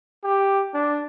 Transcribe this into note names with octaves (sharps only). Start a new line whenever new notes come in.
G4
D4